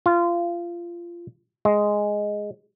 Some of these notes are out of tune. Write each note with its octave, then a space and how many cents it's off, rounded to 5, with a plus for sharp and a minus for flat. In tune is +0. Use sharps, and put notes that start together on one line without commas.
F4 -20
G#3 +0